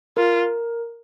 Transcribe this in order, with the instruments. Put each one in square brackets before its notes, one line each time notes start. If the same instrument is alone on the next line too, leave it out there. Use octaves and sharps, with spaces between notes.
[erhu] F4 [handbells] A#4